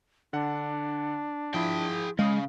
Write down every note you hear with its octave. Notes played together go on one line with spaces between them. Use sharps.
D3 D4 F#5
F3 E4 G#4 G5
C#3 G#3 F5 D#6